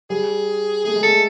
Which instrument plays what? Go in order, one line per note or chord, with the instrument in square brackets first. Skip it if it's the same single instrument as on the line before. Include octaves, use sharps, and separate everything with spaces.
[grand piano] G3 [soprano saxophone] G#4
[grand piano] A3 [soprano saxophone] G#4
[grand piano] G#3
[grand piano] A3 [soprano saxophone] A4